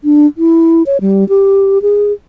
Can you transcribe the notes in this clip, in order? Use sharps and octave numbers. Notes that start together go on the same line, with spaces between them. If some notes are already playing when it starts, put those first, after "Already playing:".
D4
E4
C#5
G3
G4
G#4